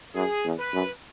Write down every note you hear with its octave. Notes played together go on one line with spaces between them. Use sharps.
F#2 G#4
E2
B4
F#2